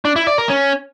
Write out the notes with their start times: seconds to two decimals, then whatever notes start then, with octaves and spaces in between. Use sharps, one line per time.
0.05 D4
0.16 E4
0.27 D5
0.38 A#4
0.49 C#4